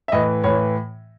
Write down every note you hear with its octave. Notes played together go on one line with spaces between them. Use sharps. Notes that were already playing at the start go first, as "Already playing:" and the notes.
E5
A2 E3 D#5
A2 E3 C#5